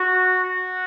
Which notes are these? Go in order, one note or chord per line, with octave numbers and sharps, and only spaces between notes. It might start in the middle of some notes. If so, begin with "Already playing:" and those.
Already playing: F#4
F#4